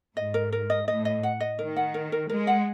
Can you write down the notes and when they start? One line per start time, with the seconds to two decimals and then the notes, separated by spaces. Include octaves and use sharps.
0.16 G#2 D#5
0.34 A#4
0.52 A#4
0.70 D#5
0.87 A2 D#5
1.05 D#5
1.23 F#5
1.40 D#5
1.59 D#3 A#4
1.76 F#5
1.94 A#4
2.12 A#4
2.30 G#3 A#4
2.47 F#5